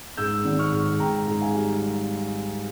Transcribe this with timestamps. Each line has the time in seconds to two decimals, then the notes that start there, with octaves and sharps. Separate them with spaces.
0.17 G#2 E6 G6
0.45 G#1
0.59 C#6 F6
0.72 G#2
1.00 G#2 G5 A#5
1.27 G#2
1.41 F5 G#5
1.55 G3